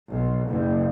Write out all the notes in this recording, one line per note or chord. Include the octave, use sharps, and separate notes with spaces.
B1
F#1